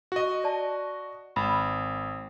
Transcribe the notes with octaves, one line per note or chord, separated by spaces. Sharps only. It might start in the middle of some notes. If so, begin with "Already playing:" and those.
F#4 D#5
D5 A5
G#1 B5